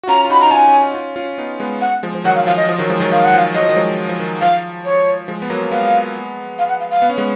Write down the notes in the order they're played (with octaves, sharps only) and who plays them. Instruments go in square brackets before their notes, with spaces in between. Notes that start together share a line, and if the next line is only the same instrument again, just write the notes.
[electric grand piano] F#4
[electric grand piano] C#4 F4 [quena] A#5
[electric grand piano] F4
[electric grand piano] D#4 F#4 [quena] B5
[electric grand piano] D#4 [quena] A#5
[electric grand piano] C#4 F4 [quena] G#5
[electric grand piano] C#4
D#4
C#4 F4
C#4 F4
B3 D#4
G#3 B3
[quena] F#5
[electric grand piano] F3 G#3
F3
[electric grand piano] D#3 F#3 [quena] F#5
[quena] F5
[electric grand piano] F3 [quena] F5
[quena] D#5
[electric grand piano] F3
D#3 F#3
F3 G#3
D#3 F#3
[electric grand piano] D#3 [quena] F5
[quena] F#5
[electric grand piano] F3 [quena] F5
[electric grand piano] F#3 [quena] D#5
[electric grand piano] F3
D#3 F#3
F3 G#3
F3
D#3
[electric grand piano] F3 [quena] F5
[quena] C#5
[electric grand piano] F3 G#3
B3
F#3 A#3
[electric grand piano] G#3 B3 [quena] F5
[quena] F5
F#5
F5
F5
[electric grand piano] B3
C#4
G#3 B3